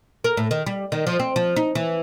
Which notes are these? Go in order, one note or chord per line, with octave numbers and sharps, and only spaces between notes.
A#4
A2
D#3
G3
D#3
F3
C4
F3
D#4
E3